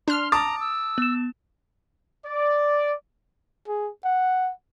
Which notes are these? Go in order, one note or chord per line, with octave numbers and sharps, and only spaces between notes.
D4 C6 F6
A5 A#5 D6 D#6 A6
E6
B3 E7
D5
G#4
F#5